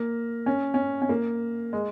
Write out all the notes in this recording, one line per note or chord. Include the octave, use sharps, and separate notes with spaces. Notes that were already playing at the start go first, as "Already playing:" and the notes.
Already playing: A#3
C#4
C#4
C#4
A#3
G#3